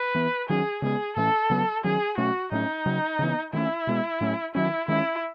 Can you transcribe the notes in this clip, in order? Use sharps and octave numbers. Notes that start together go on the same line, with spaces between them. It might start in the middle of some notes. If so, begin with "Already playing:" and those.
Already playing: B4
E3 B3
D#3 F#3 C#4 G#4
C#3 G#3 B3 G#4
A2 E3 A3 C#4 A4
C#3 F#3 B3
D#3 F#3 C#4 G#4
B2 F#3 A3 C#4 F#4
A2 F#3 A3 C#4 D#4
C#3 F#3 C#4
C#3 E3 B3
D#3 F#3 A3 C#4 E4
B2 G#3 B3
A2 F#3 A3 C#4
D#3 F#3 C#4 E4
D#3 G#3 C#4 E4